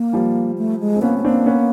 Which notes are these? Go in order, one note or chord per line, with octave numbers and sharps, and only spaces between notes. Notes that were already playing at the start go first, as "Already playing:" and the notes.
Already playing: A#3
F3 G3
A3
G#3
C4
A#3 B3 C#4
A3
A#3 C4 D4
B3 C#4